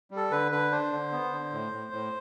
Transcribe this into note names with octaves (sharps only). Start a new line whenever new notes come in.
G3
A4
D3 B4
D3 B4
D4 C5
D3
B3
D3
A2
A2
A2